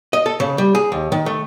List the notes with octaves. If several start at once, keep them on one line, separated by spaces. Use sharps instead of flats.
D#5
A4
C#3
G3
G#4
D#2
D#3
A3